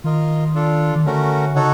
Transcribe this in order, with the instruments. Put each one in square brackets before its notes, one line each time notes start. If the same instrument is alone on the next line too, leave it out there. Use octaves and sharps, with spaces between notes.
[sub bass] D#3 [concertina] F4 A#4 D#5
[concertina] D4 F4 A4
[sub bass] D#3
[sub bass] D3 [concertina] A3 C#4 F#4 A#4
[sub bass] C#3 [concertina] D#4 F#4 A4 C#5 F#5